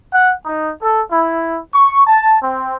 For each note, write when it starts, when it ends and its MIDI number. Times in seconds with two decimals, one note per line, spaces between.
0.12 0.31 78
0.44 0.71 63
0.81 1.00 69
1.10 1.57 64
1.73 2.02 85
2.05 2.36 81
2.41 2.75 60